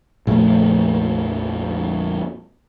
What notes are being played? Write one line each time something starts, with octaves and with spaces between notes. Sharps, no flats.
A#1 F2 A3